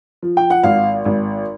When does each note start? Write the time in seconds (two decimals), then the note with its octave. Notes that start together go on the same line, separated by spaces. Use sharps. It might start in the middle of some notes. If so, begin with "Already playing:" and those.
0.22 F3
0.37 G5
0.50 F#5
0.63 G#1 F5
1.05 G#1